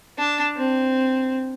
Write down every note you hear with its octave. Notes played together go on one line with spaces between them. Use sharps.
D4 A5
C4